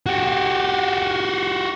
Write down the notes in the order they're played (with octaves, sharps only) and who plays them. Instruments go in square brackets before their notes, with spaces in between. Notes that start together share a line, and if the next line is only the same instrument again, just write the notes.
[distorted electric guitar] F#4 G4